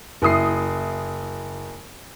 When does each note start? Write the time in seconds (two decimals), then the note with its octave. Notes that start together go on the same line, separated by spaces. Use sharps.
0.22 F#1 E4 D#6 C7